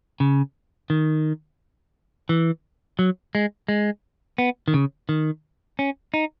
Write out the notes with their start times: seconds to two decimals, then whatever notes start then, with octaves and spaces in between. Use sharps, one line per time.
0.20 C#3
0.90 D#3
2.29 E3
2.99 F#3
3.35 G#3
3.68 G#3
4.38 B3
4.68 D#3
4.74 C#3
5.09 D#3
5.79 C#4
6.14 D#4